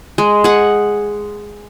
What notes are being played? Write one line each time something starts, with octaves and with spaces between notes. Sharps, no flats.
G#3
G#4 F#5